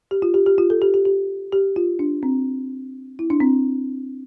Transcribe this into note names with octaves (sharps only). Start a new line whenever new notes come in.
G4
F4
G4
G4
F4
A4
G4
G4
G4
G4
F4
D4
C4
E4
D4
C4